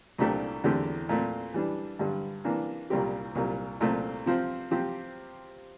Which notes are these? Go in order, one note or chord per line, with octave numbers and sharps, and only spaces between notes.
C2 A#2 A3 D4 G4
E2 D3 A3 C4 G4
A#2 A3 C4
E3 G3 D4
G2 D3 G3
C3 E3 A#3 D4
C2 A#2 G3 C4 G4
C2 A#2 G3
C2 A#2 A3 C4
C3 F3 C4
C3 F3 C4 G4